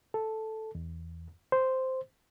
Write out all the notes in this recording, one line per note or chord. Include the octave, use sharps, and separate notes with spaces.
A4
E2
C5